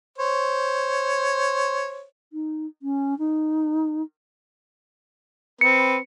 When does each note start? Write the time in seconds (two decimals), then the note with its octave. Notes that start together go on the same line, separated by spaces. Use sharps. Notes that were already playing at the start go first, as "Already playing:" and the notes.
0.18 C5 C#5
2.33 D#4
2.82 C#4
3.18 D#4
5.61 C4 B4 C#7